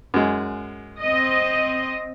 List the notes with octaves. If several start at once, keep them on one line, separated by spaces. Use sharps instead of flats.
F#2 G#3
C4 D#5